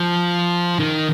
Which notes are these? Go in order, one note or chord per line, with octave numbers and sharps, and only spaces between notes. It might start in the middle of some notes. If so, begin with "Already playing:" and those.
Already playing: F3
D#3